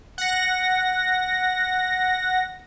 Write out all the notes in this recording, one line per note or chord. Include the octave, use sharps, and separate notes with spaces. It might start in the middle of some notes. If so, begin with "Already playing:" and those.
F#5 A#6